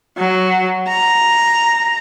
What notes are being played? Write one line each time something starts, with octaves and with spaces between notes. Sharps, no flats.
F#3
A#5